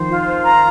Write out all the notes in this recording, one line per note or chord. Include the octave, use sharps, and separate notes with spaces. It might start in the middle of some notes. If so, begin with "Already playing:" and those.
Already playing: D#3 F3 C5
F4
A#5